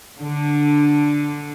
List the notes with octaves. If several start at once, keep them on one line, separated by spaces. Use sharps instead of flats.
D3